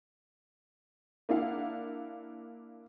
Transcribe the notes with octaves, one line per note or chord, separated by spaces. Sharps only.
A#3 D4 E4 F5 F#5